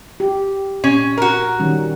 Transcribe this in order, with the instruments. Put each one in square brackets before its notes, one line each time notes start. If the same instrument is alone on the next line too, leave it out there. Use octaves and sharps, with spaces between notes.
[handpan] G4
[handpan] A#2 [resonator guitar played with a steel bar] C#4
[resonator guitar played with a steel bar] F#4 A#4
[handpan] D#3 G3 C#4